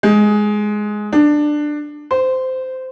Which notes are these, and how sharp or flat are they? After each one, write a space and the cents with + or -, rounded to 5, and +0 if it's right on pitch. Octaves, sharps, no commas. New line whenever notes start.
G#3 +10
D4 +15
C5 -15